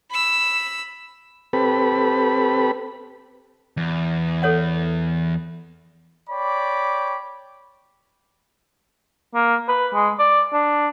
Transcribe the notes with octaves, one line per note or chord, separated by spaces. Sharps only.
B5 E6
C4 G4 A4 B4 B5
E2
A4 C#5 F#5
C#5 D5 G5 B5 D6
A#3
B4
G#3
D5
D4